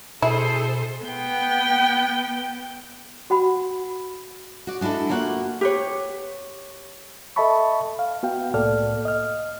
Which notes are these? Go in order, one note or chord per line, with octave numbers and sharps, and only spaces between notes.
B2 E4 G#4 A4 C5
B3 G5
F#4 F#5 B5
F#4 D5
G#3 D4 E4 F#4 A4
A3 A#3 F4 F#4 F#5
G4 B4 C#5
A4 D#5 E5 A5 B5 C#6
F5
B3 F#4 F5 G5
C2 A2 A#3 A4 D5 F6
D#5 F6